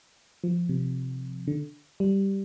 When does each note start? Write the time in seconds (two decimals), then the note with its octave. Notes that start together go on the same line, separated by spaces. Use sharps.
0.44 F3
0.69 C3
1.47 D3
2.00 G3